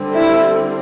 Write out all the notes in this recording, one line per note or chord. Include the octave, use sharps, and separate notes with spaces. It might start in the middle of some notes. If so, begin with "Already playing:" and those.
Already playing: D3 G3 C4
E4